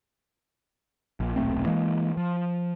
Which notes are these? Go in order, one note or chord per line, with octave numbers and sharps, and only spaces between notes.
A#1
D#1 B1 A3 C4
E3 G#3 A#3
F3